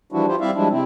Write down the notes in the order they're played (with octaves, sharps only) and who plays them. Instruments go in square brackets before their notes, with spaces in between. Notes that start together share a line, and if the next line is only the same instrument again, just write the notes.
[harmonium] E3 F3 G3 D4 E4 F#4
E4 F4 G4 C5
G3 C4 E4 D5 E5 F5
F3 G3 G#3 D4 E4
C3 C4 E4